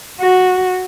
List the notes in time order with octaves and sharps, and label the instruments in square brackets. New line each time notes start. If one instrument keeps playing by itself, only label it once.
[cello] F#4